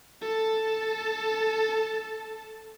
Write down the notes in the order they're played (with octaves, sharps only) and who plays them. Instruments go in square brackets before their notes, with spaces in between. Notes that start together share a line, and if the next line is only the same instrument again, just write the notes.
[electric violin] A4 A5